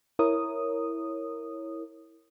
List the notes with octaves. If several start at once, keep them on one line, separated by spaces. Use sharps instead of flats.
E4 A#4 C#5 D#6